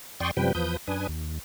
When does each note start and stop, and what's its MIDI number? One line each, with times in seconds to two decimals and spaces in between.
0.20 0.31 41
0.20 0.31 74
0.20 0.31 79
0.20 0.31 84
0.20 0.31 85
0.20 0.31 87
0.37 0.53 42
0.37 0.53 48
0.37 0.53 53
0.37 0.53 55
0.37 0.53 71
0.37 0.53 79
0.55 0.77 40
0.55 0.77 53
0.55 0.77 71
0.55 0.77 87
0.55 0.77 91
0.87 1.07 42
0.87 1.07 62
0.87 1.07 71
0.87 1.07 80
0.87 1.07 87
1.08 1.39 39